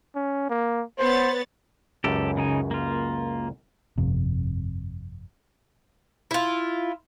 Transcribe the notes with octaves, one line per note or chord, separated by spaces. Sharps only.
C#4
A#3
B3 C5 C#5 A6
C#2 F#2 G4 A4
C#3 D#4 G#5
A#3 F4
G1 F2 C3
E4 F4